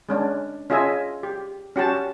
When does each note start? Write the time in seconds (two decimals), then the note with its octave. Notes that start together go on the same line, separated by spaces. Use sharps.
0.09 G#3 C#4 D4
0.70 C#4 F4 G#4 D#5 E5 G#5
1.23 G4
1.76 C#4 F#4 G4 A5